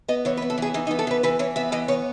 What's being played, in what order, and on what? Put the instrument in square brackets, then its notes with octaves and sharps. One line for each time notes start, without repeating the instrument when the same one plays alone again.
[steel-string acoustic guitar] B3 D#5
E3 C#5
B4
B3
A4
E3 G#4
E3 D#4
D#4
B3
A4
E3 B4
E3 B4
E3 C#5
B3 E5
E3 D#5
B3 C#5